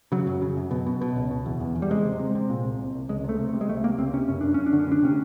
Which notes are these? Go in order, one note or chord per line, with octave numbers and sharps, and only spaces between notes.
C#3 F#3
F#2
C#3
F#2
B2
B2
B2
C#2
B2
E2
E2
E2
G3
C3 G#3
C3
C3
C3
A#2
C2
C2
C2
C#2 G#3
C3 A3
C3
A3
C3
G#3
C#2 A3
C3 A#3
C#2 C4
C3 C#4
F#2 C#4
F#2 D4
F#2 C#4
D4
D3
C#4
D2 D4
C3 C#4